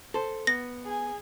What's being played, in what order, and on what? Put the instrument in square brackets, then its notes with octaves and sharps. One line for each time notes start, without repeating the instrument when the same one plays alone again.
[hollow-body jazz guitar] A4 C5
[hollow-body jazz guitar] B3 [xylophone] A#6
[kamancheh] G#4 G#5